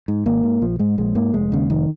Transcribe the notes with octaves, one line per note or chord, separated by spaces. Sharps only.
G#2
G#1 A#3
G#2
A#1 F3
G#2 G#3
A#1 G#3
G#2 A#3
F1 G#3
D#2 C#3
F1 D#3